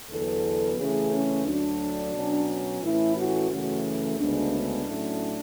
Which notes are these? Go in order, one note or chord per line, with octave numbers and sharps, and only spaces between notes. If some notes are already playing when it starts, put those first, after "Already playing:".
E2 D3 F#3 B3 A4
C#3 E3 A3 C#4 G#4
C#4
D2 D3 F#3 D4
B2 F#3 C#4
A2 E3 A3 C#4 E4
F#4
F#2 C#3 E3 A3 C#4 F#4
D2 C#3 G#3 B3 D4
D4
A2 F#3 A3 C#4